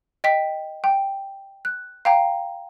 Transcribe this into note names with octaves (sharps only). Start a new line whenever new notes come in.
D#5 G5 B6
G5
F#6
F5 G5 A#5